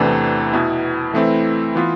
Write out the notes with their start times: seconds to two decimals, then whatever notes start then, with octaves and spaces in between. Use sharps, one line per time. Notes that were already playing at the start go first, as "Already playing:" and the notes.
Already playing: E2 C3 E3 A3 D4
0.53 B2 B3 E4
1.14 E3 A3 C4 E4
1.76 E3 B3 F4